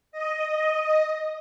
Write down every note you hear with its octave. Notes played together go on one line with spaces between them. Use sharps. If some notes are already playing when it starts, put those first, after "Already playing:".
D#5